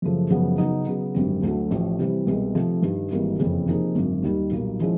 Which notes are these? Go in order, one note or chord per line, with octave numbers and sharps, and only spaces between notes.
F#2 C#3 F3 A3
F#2 C#3 F3 G#3 B3
C#3 F#3 B3 D#4
C#3 F#3 B3
G#1 F#2 D3 G3 C4
D2 D3 F#3 A3
A1 A2 F3
C3 E3 G3
C2 B2 G#3
C3 F3 A3
G2 D#3 G3
G#1 G#2 E3 G3 A#3
F#1 F2 C#3 E3
C3 F3 A#3 D#4 G#4
G#1 F#2 D3
D#2 D#3 G3
B1 A#2 G3 A#3
F3 G#3 C#4 E4